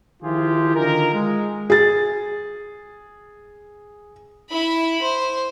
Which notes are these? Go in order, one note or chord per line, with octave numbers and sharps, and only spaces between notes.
D#3 F3 E4 F4 G4 G#4
D3 D#3 F4 A#4
G#3
G#4 A6
E4 B5
C5